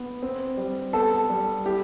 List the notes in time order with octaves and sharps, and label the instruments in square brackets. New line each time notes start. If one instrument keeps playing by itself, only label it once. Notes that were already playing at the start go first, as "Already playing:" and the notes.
Already playing: [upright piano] B3
C4
G3
B3 A4
G3
E4 G4